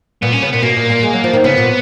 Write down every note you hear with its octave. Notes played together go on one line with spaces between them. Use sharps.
A#2 B3
C#4
C#3 B3
A#2 B3
B2 A#3
A#2
A#2
G#3
F#3
F3
D#3
C#3 B3
A#2